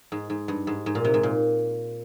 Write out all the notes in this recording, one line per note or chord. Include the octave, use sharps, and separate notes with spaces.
G#2
G#2
G2
G#2
G#2
A#2
C3
G#2
A#2